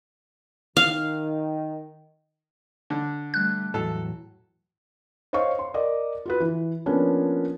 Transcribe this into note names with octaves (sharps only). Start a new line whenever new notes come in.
D#3 F5
D3
G3 A3 F#6
E2 A2 F#3 A4
C5 C#5 D#5 F5 C#6
C6
A#4 D5 D#5
F4 F#4 B4
E3
F3 A#3 B3 C#4 D4